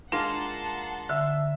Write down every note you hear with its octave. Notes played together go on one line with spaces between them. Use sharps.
G#3 A#3 D4 F4 F#5 A5 A#5 C6
D3 E5